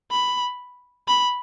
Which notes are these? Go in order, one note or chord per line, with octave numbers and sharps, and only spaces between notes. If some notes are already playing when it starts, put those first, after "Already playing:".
B5
B5